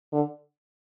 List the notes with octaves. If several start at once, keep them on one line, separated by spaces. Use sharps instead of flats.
D3